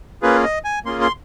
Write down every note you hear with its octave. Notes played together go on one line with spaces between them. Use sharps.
A#3 C#4 F4 G#4 B4
D#5
G#5
A#3 C#4 F4 G#4 C6
C6